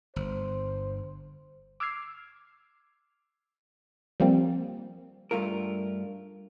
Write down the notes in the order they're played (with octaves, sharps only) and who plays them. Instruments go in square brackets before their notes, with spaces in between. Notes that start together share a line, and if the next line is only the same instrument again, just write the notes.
[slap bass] G1 [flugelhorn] C5
[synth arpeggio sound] D6 E6 F6 G#6 C7
F3 G3 A#3 C4
[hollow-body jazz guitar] G2 A3 F4 A#4